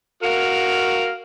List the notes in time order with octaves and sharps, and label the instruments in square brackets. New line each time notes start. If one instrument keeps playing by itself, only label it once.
[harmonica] F#4 A#4 F5